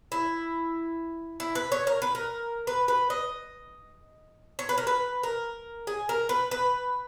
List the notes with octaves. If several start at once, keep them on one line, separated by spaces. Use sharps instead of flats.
E4
E4
B4
C#5
A#4
B4
A#4
B4
B4
D#5
C#5
B4
A#4
B4
A#4
G#4
A#4
B4
B4